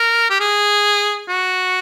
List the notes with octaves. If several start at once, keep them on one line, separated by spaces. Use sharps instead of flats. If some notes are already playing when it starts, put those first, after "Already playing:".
Already playing: A#4
G4
G#4
F#4